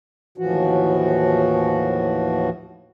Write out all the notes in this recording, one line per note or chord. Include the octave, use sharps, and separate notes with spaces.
D#2 A2 E3 F3 F#4